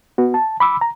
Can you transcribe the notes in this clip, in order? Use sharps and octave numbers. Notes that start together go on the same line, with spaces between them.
B3 F#4
A5
B5 D6 E6
A#5